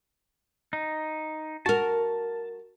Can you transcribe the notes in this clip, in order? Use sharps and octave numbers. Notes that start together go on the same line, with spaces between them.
D#4
F#4 A#4 A5